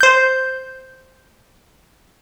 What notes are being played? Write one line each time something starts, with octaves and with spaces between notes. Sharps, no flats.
C5 G6